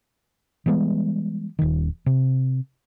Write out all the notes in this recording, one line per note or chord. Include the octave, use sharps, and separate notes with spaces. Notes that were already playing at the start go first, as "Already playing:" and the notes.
E3 G3 G#3 B3
D#1 D#3
C3